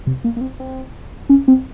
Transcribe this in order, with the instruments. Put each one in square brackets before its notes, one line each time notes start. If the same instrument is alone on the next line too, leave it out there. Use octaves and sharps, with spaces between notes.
[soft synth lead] C3
A#3
A#3
C4
C4
C#4
C4